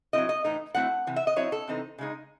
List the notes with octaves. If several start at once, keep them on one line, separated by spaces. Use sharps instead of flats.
F#3 C4 E4 D#5
D#5
A2 E3 A3 D#4
F#3 A3 C4 E4 F#5
C3 E3
E5
D#5
F#3 C4 E4 C#5
A4
C3 E3 C4 D#4
C#3 G#3 D#4